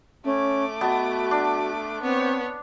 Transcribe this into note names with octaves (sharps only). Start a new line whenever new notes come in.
A3 C#4 D6
B3 F#4 D#5 A5
D4
B3 C4 C#5